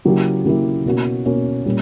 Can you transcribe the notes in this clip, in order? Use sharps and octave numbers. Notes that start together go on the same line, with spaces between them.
C#3 F#3 A#3 E4 G4
C#3 F#3 A#3 E4 G4
B2 A#3 C#4 F#4
B2 A#3 C#4 F#4
A#2 G3 C#4